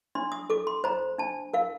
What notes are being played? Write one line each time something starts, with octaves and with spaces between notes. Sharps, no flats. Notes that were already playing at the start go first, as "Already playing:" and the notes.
D4 C6
D#6
A4 D6
C6
C5 A#5
D4 A5
A#4 F5